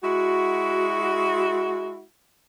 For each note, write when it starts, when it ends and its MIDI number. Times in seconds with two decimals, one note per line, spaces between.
0.03 2.03 56
0.03 2.03 64
0.03 2.03 66